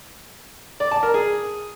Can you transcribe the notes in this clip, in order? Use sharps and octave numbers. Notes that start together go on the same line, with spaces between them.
D5
A5
A#4
G#4